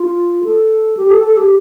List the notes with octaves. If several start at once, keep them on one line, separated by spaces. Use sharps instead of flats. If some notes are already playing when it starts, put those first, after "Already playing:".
Already playing: F4
A4
G4
A4
A4
G4